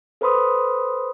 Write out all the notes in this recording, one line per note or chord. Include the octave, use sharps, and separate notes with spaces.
A4 B4 C5 B5 C6 D#6